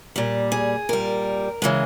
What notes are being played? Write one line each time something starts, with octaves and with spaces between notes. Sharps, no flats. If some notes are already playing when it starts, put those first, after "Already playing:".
A#2 G3
G#4
A#2 G3 A#4
C#3 E3 G#3